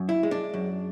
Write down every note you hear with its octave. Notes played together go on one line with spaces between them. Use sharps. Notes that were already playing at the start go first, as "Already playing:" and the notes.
Already playing: F#2
E4
G#3
D4
F#2